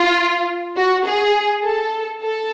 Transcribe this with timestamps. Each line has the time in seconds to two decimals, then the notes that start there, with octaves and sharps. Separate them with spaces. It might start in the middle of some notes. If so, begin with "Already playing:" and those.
Already playing: F4
0.76 F#4
1.06 G#4
1.64 A4
2.23 A4